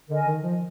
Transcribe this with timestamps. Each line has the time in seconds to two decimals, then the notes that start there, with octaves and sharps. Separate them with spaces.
0.09 D3 A#4 D#5 G#5
0.26 D#3
0.42 F3